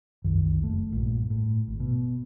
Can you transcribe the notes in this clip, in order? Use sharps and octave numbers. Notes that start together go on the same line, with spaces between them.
F#1 C2 F#2 D#3
F#1 A3
A#1 G2
A2
G#1
B2